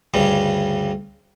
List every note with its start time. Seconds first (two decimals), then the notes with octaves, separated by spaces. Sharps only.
0.14 D2 G2 C#3 G3